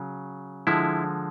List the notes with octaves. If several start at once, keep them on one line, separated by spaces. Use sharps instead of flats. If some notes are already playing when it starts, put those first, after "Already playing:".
Already playing: C#3 F#3
D3 F3 G#3 E4